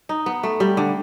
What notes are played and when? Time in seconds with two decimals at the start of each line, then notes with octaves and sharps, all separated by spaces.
0.09 D#4
0.26 B3
0.43 A3
0.60 G3
0.77 D3